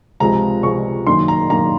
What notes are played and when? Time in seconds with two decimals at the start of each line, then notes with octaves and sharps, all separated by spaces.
0.20 C#2 C3 F3 G#3 A#5
0.63 C#2 C3 F3 G#3 C#6
1.07 F#2 D#3 A#3 C6
1.28 A#5
1.50 F#2 D#3 A#3 A#5